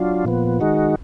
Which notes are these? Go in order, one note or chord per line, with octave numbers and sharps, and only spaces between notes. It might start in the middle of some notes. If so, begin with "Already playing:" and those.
Already playing: F#3 D4 F4
A#2 F3 B3
D#3 G#3 D#4 F#4